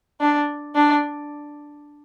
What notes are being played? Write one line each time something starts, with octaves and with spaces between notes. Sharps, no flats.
D4
D4